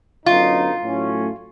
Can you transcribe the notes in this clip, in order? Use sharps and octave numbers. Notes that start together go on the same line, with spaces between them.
F#2 D3 F#3 B3 D#4 F4
A2 F#3 A3 C#4